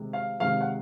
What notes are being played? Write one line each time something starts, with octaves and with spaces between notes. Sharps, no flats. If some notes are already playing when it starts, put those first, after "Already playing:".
Already playing: C3 D#3 G#3
F5
C3 D#3 G#3 F5
F#5